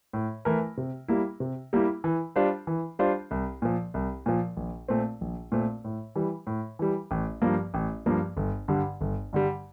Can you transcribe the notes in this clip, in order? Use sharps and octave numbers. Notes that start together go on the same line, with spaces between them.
A2
E3 A3 E4 A#4
C3
G3 A#3 E4
C3
G3 A#3 E4
E3
G3 D4 F4 C5
E3
G3 D4 F4 C5
C2
A#2 F3
C2
A#2 F3
A#1
A#2 A3 C4
A#1
A#2 A3 C4
A2
E3 G3
A2
E3 G3
A1
G2 F3 A#3
A1
G2 F3 A#3
G1
G2 D3 G3
G1
G2 D3 G3